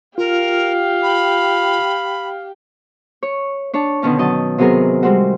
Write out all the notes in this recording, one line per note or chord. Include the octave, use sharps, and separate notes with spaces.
F4 G4 A#4 F5
B5
C#5
D4 C#5 A5
B2 D3 D#3 C#4 A5
F#3 D#5 A5
C3 F#3 B3 G#4 A#4
G3 G#3 C4 F#4